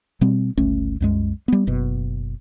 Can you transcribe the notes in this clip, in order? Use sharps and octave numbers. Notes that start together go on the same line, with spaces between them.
B2 G3 C4
G1 C#2 A3 C#4
C2 F#2 G#3
G3 B3
F#1 B2